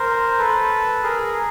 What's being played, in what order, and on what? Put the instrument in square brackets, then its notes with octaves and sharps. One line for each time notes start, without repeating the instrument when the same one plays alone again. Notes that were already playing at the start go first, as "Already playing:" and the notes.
Already playing: [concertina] A#4 C5
A4 B4
G#4 A#4